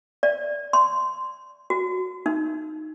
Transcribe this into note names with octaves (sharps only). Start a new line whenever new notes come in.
D5
C6
F#4
D#4